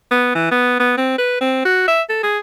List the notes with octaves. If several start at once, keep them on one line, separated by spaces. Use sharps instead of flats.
B3
E3
B3
B3
C4
B4
C4
F#4
E5
A4
G#4